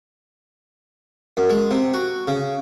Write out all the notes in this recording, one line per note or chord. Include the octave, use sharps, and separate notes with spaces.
F#2
G#3
C3
F#4
C#3